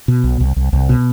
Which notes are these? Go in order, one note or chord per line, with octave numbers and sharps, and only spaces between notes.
B2
B1
C2
C2
C2
B2